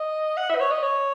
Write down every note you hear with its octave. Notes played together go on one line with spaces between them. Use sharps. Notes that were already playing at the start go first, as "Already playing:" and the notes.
Already playing: D#5
F#5
E5
B4
C#5
D#5
C#5